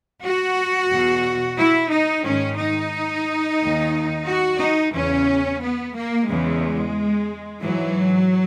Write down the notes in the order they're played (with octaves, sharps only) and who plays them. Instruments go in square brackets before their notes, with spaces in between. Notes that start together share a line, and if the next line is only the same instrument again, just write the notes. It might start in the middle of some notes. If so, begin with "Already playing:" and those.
[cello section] F#4
E2 B2
E4
D#4
G#2 D#3 C#4
D#4
D#2 D#3
F#4
D#4
E2 C#3 E3 C#4
B3
A#3
E2 C#3 E3 G#3
G#2 E3 F#3